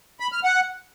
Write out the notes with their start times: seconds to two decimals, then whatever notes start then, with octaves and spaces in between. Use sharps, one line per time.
0.20 B5
0.32 F6
0.44 F#5